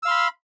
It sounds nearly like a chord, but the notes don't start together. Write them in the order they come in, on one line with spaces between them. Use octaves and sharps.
E6 F5 C6 B5